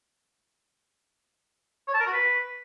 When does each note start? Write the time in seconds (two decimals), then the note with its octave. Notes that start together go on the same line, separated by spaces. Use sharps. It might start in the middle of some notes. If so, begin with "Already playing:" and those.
1.88 C#5
1.94 A5
2.00 A#4
2.07 F#4
2.13 B4